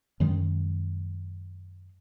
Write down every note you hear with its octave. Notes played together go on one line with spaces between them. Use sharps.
F#2 D#3 G#3